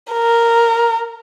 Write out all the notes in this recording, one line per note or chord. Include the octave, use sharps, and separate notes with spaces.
A#4